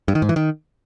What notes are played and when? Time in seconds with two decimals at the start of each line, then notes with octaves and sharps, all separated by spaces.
0.08 G2
0.15 D#3
0.22 G#2
0.29 E3
0.36 D#3